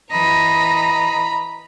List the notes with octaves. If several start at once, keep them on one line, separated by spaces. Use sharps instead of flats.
E3 D#5 A#5 B5